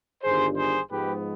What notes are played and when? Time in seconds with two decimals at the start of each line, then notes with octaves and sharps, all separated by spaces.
0.23 G1 G2 D#3 G#4 C5
0.57 G#4 C5
0.91 G#2 F3 G#3 B3 G4 B4